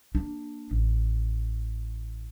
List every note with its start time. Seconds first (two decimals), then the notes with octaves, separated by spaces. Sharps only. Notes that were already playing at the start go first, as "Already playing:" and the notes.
0.15 A#3 D4
0.71 A1